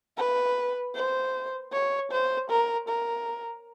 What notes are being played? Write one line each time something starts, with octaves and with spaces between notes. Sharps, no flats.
B4
C5
C#5
C5
A#4
A#4